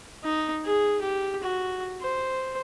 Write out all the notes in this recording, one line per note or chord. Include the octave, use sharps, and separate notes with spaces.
D#4
G#4
G4
F#4
C5